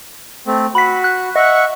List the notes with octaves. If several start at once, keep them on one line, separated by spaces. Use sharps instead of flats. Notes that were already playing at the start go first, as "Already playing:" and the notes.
A3 C4
F#4 B5 B6
F#6
D#5 E5 F#5 C#6